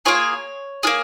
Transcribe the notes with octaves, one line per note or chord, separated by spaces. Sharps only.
A#3 F4 G#4 C#5
A#3 F4 G#4